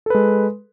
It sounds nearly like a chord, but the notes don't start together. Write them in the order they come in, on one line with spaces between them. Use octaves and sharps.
A4 B4 G#3